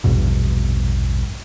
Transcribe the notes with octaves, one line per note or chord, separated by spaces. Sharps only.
A#1 E2 G2 B2